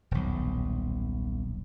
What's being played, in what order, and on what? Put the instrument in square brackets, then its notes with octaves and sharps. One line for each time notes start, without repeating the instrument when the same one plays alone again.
[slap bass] D#1 B1